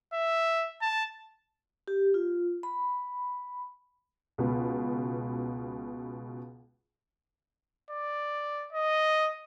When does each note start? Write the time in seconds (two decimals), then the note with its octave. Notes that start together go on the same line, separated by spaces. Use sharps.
0.13 E5
0.82 A5
1.88 G4
2.14 F4
2.63 B5
4.38 C#2 B2
7.91 D5
8.73 D#5